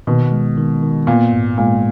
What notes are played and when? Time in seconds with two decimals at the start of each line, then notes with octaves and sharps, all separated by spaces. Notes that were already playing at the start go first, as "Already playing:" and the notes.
0.07 B2 D#3
0.32 G#3
0.57 D#3
0.83 D#3
1.07 A#2 B3
1.33 G#2
1.58 A#2 G#3